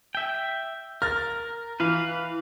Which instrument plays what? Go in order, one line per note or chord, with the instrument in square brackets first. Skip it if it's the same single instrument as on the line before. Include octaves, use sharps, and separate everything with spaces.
[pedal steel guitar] E5 G5
[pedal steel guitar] A#4 [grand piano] F6 A6
[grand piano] E3 [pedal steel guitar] B4 F5